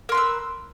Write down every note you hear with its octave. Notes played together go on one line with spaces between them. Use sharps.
A#4 B4 C6 E6